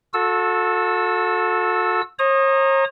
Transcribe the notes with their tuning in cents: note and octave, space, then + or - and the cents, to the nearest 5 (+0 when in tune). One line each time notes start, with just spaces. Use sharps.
F#4 -40 A4 +0 E6 -10
C#5 -45 A#5 +0 D#6 -10